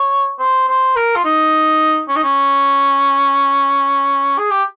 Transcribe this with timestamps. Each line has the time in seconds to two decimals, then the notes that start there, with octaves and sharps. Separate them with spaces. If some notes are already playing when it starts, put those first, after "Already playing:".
Already playing: C#5
0.39 C5
0.68 C5
0.96 A#4
1.16 F4
1.25 D#4
2.09 C#4
2.16 D#4
2.23 C#4
4.38 G#4
4.51 G4